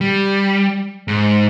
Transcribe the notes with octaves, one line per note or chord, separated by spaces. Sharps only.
G3
G#2